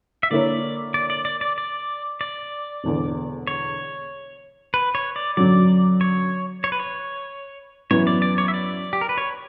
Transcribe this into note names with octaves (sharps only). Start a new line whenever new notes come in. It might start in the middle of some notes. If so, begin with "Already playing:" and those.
E5
D3 A#3 E4 A#4 C#5 D5
D5
D5
D5
D5
D5
D5
E1 E2 D3
C#5
B4
C#5
D5
F#2 D3 F#3 D5
C#5
C#5
B4
C#5
F#2 E3 B3 E4 B4 C#5
D5
D5
C#5
E5
D5
G4
A#4
B4
C#5